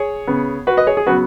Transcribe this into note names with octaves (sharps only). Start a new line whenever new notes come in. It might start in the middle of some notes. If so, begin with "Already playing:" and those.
Already playing: G#4 C#5
C#3 B3
F#4 B4
B4 D#5
G#4 C#5
G#4
C#3 F#3 B3 F#4 B4